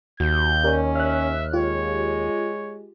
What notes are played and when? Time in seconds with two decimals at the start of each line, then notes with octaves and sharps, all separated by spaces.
0.20 D#2 F#4 G6
0.64 C#4 G4 A#4 D5
0.95 E5 F6 F#6
1.53 G#3 F4 G4 C#5